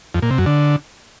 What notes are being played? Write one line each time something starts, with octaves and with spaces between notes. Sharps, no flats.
F2
A#2
C3
F#2
D3